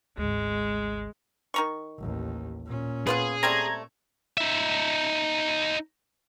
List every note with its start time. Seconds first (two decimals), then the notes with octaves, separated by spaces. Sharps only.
0.17 G#1 D2 G#3
1.54 D#3 A#5 C#6
1.99 A1 D#2
2.65 A#2 C#4
3.07 B3 F4 G#4 B4
3.43 G3 A3 C4 A#5 G#6
4.38 D#4 E5